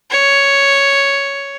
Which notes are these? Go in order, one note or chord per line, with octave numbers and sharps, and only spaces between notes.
C#5